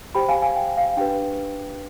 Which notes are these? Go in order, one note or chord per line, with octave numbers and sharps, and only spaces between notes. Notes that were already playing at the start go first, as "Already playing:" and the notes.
G4 C5 G5 B5
F5 G#5
F5 G#5
G5
F5
D4 G4 B4 G5